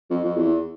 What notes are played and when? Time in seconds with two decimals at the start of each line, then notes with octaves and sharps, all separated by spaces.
0.10 F2
0.25 F2
0.37 E2